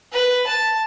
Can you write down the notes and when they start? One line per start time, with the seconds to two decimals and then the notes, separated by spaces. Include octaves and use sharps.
0.12 B4
0.46 A5